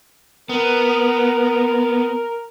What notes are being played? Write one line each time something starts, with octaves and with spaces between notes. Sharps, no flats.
B3 A#4